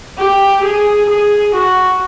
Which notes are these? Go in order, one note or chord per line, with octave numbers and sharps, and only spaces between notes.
G4
G#4
G#4
F#4